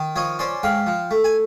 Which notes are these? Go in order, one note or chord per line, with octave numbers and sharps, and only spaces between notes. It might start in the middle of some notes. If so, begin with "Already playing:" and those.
Already playing: D#3
F3 C#5 D#5
C#4 C5 D5
G#2 F5 G5
F3
A3
G#5